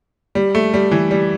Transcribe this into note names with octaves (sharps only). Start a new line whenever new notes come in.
G3
A3
G3
E3
G3